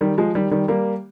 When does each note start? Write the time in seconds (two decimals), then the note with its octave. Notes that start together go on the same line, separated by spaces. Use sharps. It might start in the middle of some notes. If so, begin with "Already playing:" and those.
0.01 D#3 G3
0.18 F3 G#3
0.35 D#3 G3
0.51 D#3 G3
0.68 G3 A#3